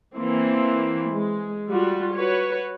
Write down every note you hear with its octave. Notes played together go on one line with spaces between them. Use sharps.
E3 A#3 C4
G#3
G3 F4 F#4
F#4 B4 C#5